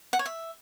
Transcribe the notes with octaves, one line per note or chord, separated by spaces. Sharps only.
F#5
C#5
E5